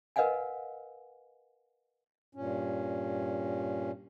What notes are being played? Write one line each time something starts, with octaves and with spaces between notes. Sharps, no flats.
A#4 B4 D#5 F5 F#5 G#5
G2 A#2 C#4